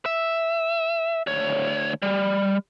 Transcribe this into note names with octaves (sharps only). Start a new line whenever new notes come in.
E5
D2 C#5
G3